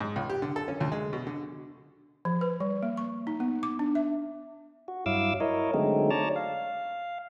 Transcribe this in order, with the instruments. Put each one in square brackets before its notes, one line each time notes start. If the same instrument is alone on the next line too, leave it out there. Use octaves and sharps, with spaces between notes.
[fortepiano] G#2
C#2
G4
D3
A4
C#4
D2
G#3
B2
D3
[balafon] F3
B4
G3
A#3
C#6
D#4
B3
D6
D4
E5
[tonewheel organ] F#4
G2 F#3 E4 F5 D6 E6
E4 A#4 C#5 D#5
D3 F#3 G#3 A3 C4 D#4
C#5 D5 A5 A#5
F5